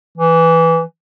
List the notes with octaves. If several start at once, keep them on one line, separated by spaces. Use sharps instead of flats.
E3